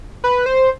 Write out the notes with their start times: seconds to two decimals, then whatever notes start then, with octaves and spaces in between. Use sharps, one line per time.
0.24 B4
0.46 C5